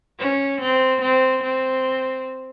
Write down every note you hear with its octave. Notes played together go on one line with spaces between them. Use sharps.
C#4
C4
C4
C4